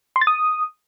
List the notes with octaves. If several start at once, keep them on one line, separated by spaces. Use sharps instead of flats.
C6
A6
D#6